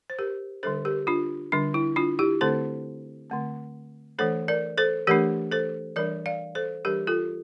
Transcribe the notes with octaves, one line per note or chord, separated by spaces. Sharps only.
C5
G4 A#4
D3 G3 D4 A4 C5
G4 A#4
D4 F4
D3 G3 D4
E4
D4 F4
E4 G4
D3 A3 C4 A4 C5
D3 A3 C4
E3 A3 D4 A4 C5
A#4 D5
A4 C5
E3 A3 D4 G4 A#4
A4 C5
E3 G3 D4 A#4 D5
D5 F5
A4 C5
E3 G3 D4 G4 A#4
F4 A4